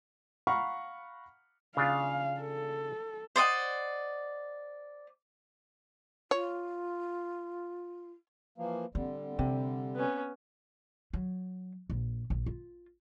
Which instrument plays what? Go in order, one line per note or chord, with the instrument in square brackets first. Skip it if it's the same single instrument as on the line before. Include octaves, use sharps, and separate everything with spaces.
[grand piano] F5 F#5 A#5 B5 C#6 F6
[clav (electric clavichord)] C#3 D4 F4 [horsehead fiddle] F5
[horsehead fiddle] A4
[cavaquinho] C5 D5 D#5 F#5
[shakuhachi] F4 [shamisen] C#5
[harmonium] E3 F3 A#3
[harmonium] D3 G3 [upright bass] C4
[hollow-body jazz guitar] C3 [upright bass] C4
[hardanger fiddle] B3 C#4
[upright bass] F#3
A#1
A#1
F4